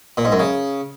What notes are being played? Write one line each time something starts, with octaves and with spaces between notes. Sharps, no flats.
A#2
G#2
F#2
C#3